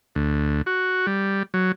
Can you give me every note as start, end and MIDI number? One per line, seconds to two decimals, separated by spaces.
0.15 0.62 38
0.66 1.06 66
1.07 1.43 55
1.54 1.72 54